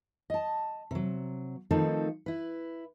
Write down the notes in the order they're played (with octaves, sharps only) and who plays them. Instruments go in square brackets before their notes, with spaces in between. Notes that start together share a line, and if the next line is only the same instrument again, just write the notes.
[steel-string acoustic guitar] D#5 A5
C3 F#3
D#3 F3 A3 C4 D#4 A4
E4 B4